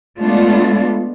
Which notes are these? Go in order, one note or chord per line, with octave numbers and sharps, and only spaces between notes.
G#3 A3 B3 D4 F4